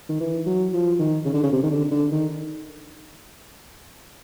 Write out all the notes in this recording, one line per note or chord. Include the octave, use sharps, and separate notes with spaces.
D#3
E3
F#3
F3
D#3
C#3
D3
C#3
C3
D#3
D3
D3
D#3